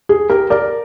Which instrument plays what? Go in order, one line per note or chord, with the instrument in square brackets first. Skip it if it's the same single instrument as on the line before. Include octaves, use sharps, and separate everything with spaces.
[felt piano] G#4
G4 A#4
A#4 D5